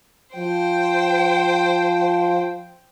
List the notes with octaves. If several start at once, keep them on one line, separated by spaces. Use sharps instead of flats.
F3 C5 G5